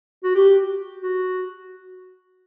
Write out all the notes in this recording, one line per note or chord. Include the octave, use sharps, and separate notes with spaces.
F#4
G4
F#4